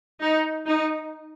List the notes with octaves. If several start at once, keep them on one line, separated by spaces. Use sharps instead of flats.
D#4
D#4